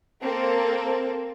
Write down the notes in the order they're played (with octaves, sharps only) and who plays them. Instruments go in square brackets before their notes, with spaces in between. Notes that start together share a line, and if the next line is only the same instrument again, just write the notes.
[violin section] A#3 C4 A4